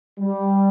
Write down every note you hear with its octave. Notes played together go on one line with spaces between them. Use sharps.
G3